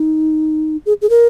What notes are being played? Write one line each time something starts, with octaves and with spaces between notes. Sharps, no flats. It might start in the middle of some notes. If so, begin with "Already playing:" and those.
Already playing: D#4
G#4
G#4
A#4